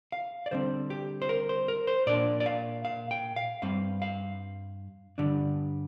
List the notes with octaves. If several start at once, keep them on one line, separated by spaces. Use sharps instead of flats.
F5
D5
D3 G3 C4 C5
G4
C5
A#4
C5
A#4
C5
A#2 A#3 D4 D5
D5
F5
F5
G5
F5
G2 G3 C4 F5
F5
G2 D3 G3 D4